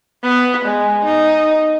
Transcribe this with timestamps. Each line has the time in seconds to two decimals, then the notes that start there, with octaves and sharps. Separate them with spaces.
0.23 B3
0.65 G#3
1.05 D#4